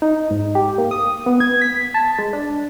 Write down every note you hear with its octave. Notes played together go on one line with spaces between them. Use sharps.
D#4
G#2
G4
A#3
D#6
B3
G#6
B6
A5
G#3
D4